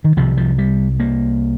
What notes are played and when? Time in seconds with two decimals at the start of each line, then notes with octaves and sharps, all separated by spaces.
0.04 D#3
0.17 C2 C3 F3
0.37 F3
0.58 G3
1.00 A#3